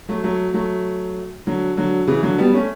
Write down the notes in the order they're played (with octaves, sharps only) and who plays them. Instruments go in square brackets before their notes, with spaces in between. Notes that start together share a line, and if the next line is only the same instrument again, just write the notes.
[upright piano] F#3 A3
F#3 A3
F#3 A3
D3 F#3
D3 F#3
C#3 E3
D3 F#3
G3 B3
A3 C#4